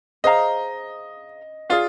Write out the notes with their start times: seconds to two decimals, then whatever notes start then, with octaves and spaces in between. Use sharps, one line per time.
0.24 G#4 C5 D#5 F5 A#5
1.70 F4 G#4 D5 F5